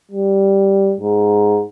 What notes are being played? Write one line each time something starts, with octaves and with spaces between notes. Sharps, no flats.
G3
G#2